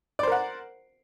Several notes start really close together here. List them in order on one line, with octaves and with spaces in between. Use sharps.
D5 C5 A#4 F#5